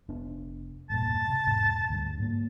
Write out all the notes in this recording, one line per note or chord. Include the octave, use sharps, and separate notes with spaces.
F1 B3 D4
E1 G2 A#2 A5
C3
E1 G#2
D2 G2
G#2 A#3